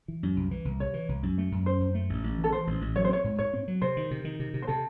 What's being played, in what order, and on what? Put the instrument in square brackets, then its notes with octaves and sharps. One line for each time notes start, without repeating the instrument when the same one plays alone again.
[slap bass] E3
F#2
C2
E3
C2
[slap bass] C3 [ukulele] C#5
[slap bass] E3
C2
F#2
A3
F#2
[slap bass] C#4 [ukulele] C5
[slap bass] F#2
A3
A1
A1
E3
[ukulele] A4
[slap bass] E3 [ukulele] C5
[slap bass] A1
A1
[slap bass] F#3 [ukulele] C#5
[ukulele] C5
[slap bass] C4 [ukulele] C#5
[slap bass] G#2
[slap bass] G#2 [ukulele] C#5
[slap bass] C4
F#3
[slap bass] C3 [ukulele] C5
[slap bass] D#3
C3
D#3
C3
C3
[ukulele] C5
[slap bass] C3 [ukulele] A4